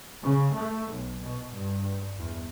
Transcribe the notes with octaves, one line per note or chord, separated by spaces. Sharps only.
C#3
A3
B1
B2
G2
E2